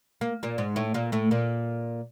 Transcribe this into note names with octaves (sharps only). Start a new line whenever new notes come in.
A#3
A#2 A#3
G#2 G#3
A2 A3
A#2 A#3
A2 A3
A#2 A#3